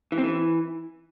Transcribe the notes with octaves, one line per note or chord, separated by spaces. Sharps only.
E3
C4
E3